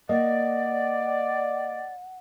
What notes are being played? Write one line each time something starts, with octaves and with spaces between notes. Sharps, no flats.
A#3 D5 D#5 F#5